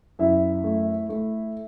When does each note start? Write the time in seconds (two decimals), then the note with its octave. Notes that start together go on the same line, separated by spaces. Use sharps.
0.19 F#2 E4 E5
0.64 A3
1.09 A3